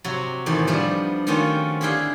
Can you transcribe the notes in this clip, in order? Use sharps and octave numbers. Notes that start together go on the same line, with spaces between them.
C3 F#3 F#4
E2 A2 D#3 C5
F3 G3 B3 D4 G4
D#3 A3 C4 C#4 F4 F#4
D3 E4 G4 G#4 F5 G5